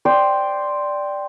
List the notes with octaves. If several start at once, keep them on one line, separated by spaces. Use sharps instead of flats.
C5 D5 G5